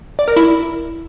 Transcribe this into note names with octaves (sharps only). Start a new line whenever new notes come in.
D5
A#4
E4